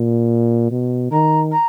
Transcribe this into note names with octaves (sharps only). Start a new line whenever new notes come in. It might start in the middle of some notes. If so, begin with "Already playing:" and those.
Already playing: A#2
B2
D#3 A#5
A#5